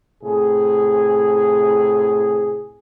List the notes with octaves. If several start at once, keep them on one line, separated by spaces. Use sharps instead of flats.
A2 C3 G#4